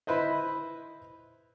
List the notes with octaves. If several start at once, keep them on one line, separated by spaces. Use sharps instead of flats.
E4 B4 C5 D#5